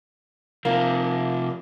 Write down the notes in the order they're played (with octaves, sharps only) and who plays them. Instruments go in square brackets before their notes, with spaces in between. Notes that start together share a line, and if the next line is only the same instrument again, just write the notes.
[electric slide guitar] C3 F3 [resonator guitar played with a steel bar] A#3